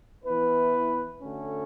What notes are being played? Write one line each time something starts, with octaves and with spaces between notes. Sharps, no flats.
E3 B3 E4 B4
D3 A3 C#4 F#4 A4